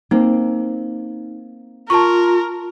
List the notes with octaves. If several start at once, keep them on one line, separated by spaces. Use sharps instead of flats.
A#3 C4 D#4
F4 A#4 A5 C#6